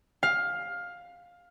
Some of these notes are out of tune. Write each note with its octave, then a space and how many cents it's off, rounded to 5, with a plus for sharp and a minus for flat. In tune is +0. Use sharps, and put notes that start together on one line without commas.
F5 +15